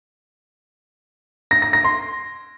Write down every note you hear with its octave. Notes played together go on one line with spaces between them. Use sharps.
A#6
A#6
A#6
C6